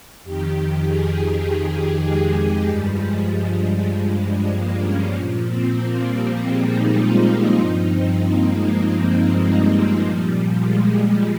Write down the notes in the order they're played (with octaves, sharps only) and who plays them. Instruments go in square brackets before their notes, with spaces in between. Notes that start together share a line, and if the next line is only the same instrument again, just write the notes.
[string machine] F2 D#3 G4
G#4
G4
G#3
G2 F3 G3
G#3
G3
G3
G#3
A#3
C#4
A#2 F3
C4
A#3
G3
G#3
D#4
F4
G2 F3 D#4
C4
A#3
G#3
G#3
G#3
G3
A#2 F3
G#3
G#3